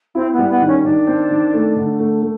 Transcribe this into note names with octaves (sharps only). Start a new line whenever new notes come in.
C4 E4
B3
G3
B3
D#3
C#4
D#3 D4
C4
D#3
A3
D3
A3
A3